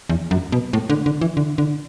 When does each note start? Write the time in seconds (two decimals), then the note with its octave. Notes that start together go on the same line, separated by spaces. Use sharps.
0.09 E2
0.31 F#2
0.52 B2
0.73 A2
0.90 D3
1.06 D3
1.21 E3
1.37 D3
1.58 D3